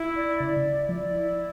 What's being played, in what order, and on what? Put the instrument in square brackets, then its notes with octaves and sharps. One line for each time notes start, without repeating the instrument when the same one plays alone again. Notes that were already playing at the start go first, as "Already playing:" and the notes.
Already playing: [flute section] E4
D5
[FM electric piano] C#3 [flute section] D5
[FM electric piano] C#3
[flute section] E4
[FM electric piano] F3 [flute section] D5
[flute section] E4